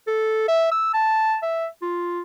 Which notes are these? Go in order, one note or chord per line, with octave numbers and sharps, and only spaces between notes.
A4
E5
E6
A5
E5
F4